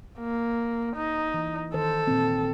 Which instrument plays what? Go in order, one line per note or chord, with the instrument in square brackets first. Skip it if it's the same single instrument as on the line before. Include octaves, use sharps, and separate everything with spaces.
[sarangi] A#3
D#4
[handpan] E3
[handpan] D#3 C5 [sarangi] A4
[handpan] A#2 C4